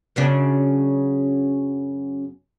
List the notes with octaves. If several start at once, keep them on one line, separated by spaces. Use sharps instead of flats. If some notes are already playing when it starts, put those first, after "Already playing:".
F#2 C#3 D4